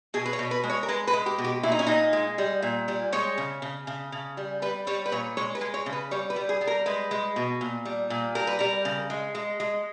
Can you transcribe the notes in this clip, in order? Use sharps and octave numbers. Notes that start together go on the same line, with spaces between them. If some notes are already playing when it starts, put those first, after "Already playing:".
B2 G#4
B4
C#5
B2
B4
G#3
C#5
A#4
G#3 B4
B4
G#3
G4
B2
G4
A#2 E4
D#4
C#4
A#2 D#4
G#3
G3
A#2
G3
G#3 C#5
C#3
C#3
C#3
C#3
G3
G3 B4
G3 C#5
B4
A#2 C#5
G#3 C#5
B4
G#3
C#5
C#3
B4
G3 C#5
B4
G3
G#4
G3
A#4
G#3 B4
G#3
B2
A#2
G3
A#2
G3 A#4
B4
G3 A#4
C#3
G#3
G#3
G#3